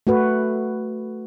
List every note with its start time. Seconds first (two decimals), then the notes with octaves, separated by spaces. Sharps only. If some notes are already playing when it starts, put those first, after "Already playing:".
0.07 A3 F#4 B4